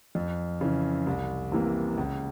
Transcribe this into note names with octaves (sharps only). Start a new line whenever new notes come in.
F2
C#3 E3
C2
C3 E3 A#3
C#2